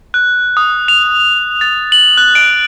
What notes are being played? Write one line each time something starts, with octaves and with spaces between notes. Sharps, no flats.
F#6
D#6
F7
A6
F#7
F#6
D7